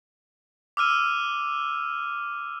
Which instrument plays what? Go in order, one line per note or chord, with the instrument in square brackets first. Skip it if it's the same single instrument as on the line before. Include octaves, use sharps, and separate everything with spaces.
[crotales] D6 E6 F6 D#7